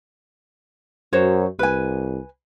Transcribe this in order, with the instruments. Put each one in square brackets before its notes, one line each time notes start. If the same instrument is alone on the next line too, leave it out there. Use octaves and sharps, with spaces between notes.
[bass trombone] F#2 [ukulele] F#4 C5 C#5
[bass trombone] C2 [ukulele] B4 G#5